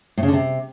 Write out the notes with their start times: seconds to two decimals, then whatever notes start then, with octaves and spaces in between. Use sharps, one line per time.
0.18 A2
0.23 C#3
0.28 D3
0.33 C3